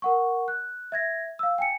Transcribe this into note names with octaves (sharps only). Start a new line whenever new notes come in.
A#4 F#5 C#6
F#6
E5 G#6 A#6
F5 E6
G5 G#5 C#7